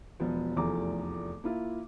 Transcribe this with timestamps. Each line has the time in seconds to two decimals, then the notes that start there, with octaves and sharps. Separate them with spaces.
0.20 E1 F3 B3
0.56 F1 E2 F3 A3 A#5 D6
1.44 A#3 E4 F4